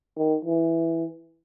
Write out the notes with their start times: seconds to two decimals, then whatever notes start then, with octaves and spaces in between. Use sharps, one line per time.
0.17 D#3
0.45 E3